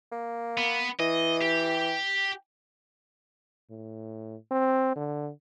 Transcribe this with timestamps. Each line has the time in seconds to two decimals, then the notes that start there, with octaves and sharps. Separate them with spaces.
0.12 A#3
0.58 B3
1.00 E3 D#5
1.42 G4
3.70 A2
4.51 C4
4.96 D3